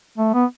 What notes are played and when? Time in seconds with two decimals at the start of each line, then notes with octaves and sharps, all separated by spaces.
0.18 A3
0.34 B3